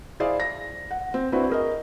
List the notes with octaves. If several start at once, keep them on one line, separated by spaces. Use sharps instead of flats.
E4 G#4 C5 D5 F5
A#6
F#5
C4
C4 D4 E4 F#4 B4 C5
G#4 A#4 D#5